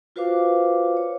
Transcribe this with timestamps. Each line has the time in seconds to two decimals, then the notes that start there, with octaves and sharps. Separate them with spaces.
0.16 F4 F#4 B4 C5 F5 D6
0.97 C#5